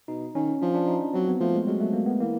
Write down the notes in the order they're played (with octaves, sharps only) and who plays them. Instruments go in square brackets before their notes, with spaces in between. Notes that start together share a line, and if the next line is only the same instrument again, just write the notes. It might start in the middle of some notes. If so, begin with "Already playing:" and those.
[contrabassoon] B2 [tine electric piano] D#4
[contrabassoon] D#3 [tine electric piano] C#4
[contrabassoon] F3 [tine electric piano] D4
[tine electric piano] D4
D#4
[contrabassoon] F#3 [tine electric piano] C4
[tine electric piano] B3
[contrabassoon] F3 [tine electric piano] A3
[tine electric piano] G#3
[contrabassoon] F#3 [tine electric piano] G#3
[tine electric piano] A3
A#3
B3
[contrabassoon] E3 [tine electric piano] A#3